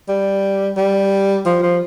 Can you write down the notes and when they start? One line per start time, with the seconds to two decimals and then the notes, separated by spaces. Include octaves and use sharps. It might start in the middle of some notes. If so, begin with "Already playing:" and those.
0.09 G3
0.77 G3
1.46 F3
1.63 F3